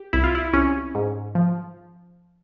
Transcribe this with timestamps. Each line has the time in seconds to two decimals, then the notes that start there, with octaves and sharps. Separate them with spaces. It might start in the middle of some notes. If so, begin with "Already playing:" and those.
Already playing: G4
0.13 C2 E4
0.24 F4
0.35 E4
0.53 C2 C#4
0.95 G#2
1.35 F3